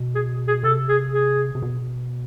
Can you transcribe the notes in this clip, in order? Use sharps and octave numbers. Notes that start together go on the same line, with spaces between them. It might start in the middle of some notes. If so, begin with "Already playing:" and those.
Already playing: B2
G#4
G#4
C3 A4
G#4
G#4
C3
B2